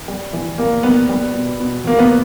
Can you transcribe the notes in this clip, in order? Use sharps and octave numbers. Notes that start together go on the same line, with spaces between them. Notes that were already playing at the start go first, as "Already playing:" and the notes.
G3
E3
G3 A#3
G3 B3
G3 B3
B2
B2
E2 A#3
B3